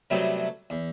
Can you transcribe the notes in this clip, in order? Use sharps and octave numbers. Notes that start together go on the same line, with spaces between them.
C3 F#3 G3 A3 B3
E2